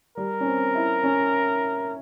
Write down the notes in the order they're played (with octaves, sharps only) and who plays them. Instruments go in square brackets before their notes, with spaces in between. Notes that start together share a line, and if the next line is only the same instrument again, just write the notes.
[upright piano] G3 [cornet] A#4
[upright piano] C#4
C4
E4
C#4